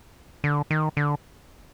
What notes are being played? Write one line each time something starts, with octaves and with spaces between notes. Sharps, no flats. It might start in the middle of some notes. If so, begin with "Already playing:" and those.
D3
D#3
D3